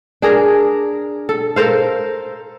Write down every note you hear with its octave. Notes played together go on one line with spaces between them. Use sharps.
D4 G#4 A#4
A4
A4 A#4 C5 F5